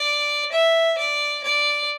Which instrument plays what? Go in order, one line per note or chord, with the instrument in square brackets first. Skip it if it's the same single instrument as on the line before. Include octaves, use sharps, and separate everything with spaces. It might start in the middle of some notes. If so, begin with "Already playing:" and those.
Already playing: [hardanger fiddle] D5
E5
D5
D5